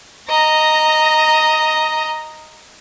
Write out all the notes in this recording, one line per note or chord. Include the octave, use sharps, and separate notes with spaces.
D#5 A#5